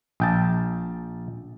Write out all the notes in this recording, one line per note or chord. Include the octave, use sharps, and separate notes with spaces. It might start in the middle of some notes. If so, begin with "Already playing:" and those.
A#1 G5 A5